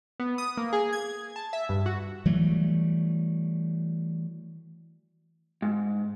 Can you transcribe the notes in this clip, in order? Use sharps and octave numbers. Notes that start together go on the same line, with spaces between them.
B3
D#6
A#3
G#4
G#6
A5
E5
G2
F#4
E3 F#3 G3 A3
G#2